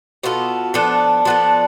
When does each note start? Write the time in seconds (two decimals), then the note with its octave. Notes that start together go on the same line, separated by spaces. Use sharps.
0.23 B2 B3 F4 A4
0.74 F3 B3 D4 A4
1.25 F3 B3 D4 A4